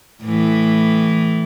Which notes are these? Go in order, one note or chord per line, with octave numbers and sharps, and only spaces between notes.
A2 E3